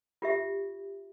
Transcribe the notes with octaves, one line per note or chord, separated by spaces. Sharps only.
F4 G4 E5